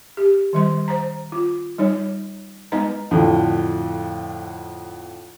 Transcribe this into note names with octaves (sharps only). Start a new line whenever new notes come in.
G4
D#3 G3 C6
C5 A#5
F4
G3 D#4 C#5
G#3 B3 D#4 B4 D#5 A#5
F2 A2 D3